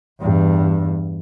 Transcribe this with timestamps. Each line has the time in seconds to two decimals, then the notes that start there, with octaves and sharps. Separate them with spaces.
0.20 E2 G2